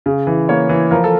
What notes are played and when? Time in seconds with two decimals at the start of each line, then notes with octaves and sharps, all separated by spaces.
0.06 C#3
0.27 E3
0.49 A#3 C#5
0.69 E3
0.91 F3 A#4
1.04 A4